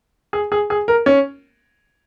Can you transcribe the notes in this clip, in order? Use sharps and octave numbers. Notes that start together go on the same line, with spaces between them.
G#4
G#4
G#4
A#4
C#4